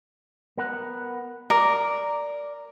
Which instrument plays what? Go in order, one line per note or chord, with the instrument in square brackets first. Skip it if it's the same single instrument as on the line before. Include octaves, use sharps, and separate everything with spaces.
[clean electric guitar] B3 A#4 F#5
[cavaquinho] A#4 [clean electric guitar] D5